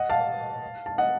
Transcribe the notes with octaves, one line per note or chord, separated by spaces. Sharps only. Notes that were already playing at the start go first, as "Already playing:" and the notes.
Already playing: D#5 F#5
F5 A5
A5
D#5 F#5